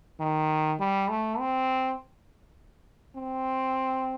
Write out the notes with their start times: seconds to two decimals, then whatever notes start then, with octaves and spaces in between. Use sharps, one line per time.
0.20 D#3
0.80 G3
1.09 A3
1.39 C4
3.16 C4